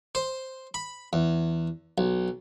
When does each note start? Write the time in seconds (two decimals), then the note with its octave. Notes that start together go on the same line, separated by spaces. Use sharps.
0.15 C5
0.74 B5
1.13 E2
1.98 B1